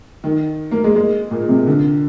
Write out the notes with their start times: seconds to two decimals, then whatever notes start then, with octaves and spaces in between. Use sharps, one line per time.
0.24 D#3
0.71 A#3
0.84 G#3
0.95 G#3
1.31 A#2
1.49 C3
1.67 D3